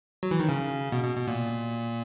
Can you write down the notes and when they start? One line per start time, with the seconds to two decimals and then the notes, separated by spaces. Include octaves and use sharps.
0.23 F#3
0.31 E3
0.40 D#3
0.49 C#3
0.92 B2
1.04 B2
1.16 B2
1.27 A#2